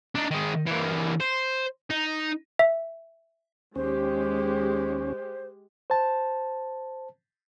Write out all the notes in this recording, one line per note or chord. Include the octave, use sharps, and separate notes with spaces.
D4 D#4
D#3 G#3
E3 A#3
C5
D#4
E5
D#2 G#3 C#4 G4 C5
C5 A5